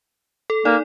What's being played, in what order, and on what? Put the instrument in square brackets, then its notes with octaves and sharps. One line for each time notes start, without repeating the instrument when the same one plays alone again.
[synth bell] A4
[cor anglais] A#3 [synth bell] D#4 D5